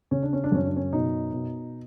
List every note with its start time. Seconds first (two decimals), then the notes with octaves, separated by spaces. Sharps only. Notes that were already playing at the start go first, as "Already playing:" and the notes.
0.11 C#3 C#4
0.23 D4
0.33 C#4
0.44 D4
0.52 F#2 C#4
0.65 D4
0.76 C#4
0.92 B2 D#4
1.33 B2